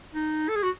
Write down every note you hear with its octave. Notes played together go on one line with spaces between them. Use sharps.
D#4
A4
G#4
F#4